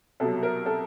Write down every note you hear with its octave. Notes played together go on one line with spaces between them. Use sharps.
C2 B2 F#3 A4
A#4
A4